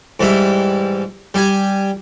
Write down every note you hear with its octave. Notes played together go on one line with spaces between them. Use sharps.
G#2 E3 G3 E4
G3 G4 G#5